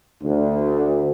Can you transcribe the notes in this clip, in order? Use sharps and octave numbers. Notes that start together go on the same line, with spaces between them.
D2